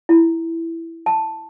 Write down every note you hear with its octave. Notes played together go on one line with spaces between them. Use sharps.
E4
A5